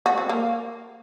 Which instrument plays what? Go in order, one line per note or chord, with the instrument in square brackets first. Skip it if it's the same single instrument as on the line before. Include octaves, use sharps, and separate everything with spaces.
[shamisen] F#4
C4
A#3